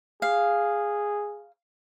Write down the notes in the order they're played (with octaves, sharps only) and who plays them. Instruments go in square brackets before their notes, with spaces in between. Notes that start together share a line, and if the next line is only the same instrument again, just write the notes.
[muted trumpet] G#4 [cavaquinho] F5